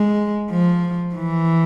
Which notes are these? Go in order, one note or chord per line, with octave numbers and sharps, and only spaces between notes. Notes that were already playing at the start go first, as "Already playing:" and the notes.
Already playing: G#3
F3
E3